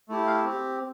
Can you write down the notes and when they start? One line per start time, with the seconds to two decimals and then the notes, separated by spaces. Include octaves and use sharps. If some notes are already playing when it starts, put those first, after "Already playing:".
0.09 A3 E4 G4
0.27 F5
0.44 C4 G4